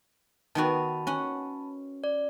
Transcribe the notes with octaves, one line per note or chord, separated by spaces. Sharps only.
D#3 B3 F#4 A5 B5
C#4 F#5
D5